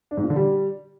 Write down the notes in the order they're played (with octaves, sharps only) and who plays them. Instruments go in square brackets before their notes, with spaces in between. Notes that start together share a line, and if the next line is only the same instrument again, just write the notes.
[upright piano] D4
G#2
A#2
D3
G3